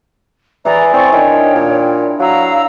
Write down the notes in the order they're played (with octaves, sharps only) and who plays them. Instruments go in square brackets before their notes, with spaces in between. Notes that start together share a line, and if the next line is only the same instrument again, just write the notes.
[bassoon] E3 [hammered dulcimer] E4 G#4 [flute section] D5 A#5
[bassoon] C4 [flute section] D5 C#6
[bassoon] D#3 [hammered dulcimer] D4 E4 [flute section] C#5 G5
[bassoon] A#2
[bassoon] F#3 [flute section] F5 A#5 E6